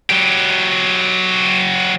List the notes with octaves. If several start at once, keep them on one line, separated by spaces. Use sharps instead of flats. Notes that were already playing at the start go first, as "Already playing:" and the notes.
F#3 G4